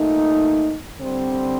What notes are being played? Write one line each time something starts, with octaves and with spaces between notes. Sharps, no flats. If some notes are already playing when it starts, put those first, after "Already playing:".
Already playing: A#2 A3 D#4
D3 G3 C4